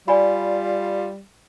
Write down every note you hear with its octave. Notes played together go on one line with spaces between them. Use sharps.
G3 F4 D5 G#5 B5